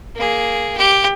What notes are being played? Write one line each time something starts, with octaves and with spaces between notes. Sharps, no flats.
A#3 G#4
G4